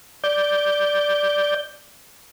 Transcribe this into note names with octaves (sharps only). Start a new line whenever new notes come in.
D5 G6